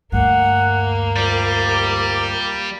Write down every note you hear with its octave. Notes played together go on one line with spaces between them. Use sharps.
D2 G2 A#3 F#5
C2 G3 F4 D6